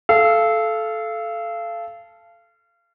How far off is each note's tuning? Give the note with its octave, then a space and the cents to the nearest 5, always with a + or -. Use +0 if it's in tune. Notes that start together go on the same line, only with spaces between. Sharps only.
A4 -15 F5 -30